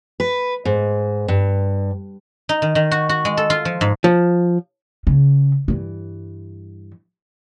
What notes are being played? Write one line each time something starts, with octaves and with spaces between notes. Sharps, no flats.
B4
G#2
G2
D#4
D#3
D#3
F#4
F#4
G#3
A4
F4
F3
G#2
F3
C#3
G2 E3